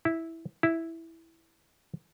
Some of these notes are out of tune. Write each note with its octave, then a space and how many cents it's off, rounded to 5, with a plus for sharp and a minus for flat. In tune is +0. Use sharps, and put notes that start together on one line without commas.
E4 -10
E4 -5